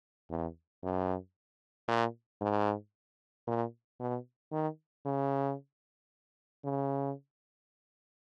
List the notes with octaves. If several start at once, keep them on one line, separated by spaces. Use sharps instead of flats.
E2
F#2
A#2
G#2
A#2
B2
D#3
C#3
C#3